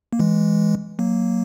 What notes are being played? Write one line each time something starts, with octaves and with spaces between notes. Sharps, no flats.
A#3
E3 G#3
F#3 A#3